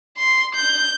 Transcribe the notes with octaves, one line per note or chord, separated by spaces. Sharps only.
C6
G6